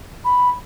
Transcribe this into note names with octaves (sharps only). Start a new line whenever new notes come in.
B5